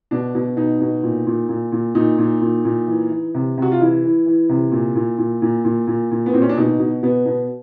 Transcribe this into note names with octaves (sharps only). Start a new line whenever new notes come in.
B2 D4
B2
B2 D#4
B2
A#2
A#2
A#2
A#2
A#2 D#4
A#2
A#2
A#2
E3
E3
C3
C3 F#4
F4
E3 E4
E3
E3
C3
A#2
A#2
A#2
A#2
A#2
A#2
A#2
B3
A#2 C4
C#4
D4
B2 D#4
B2
B2 B3
B2